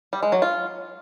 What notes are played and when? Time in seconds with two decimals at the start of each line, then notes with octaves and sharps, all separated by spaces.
0.13 G3
0.23 G#3
0.32 F#3
0.42 F4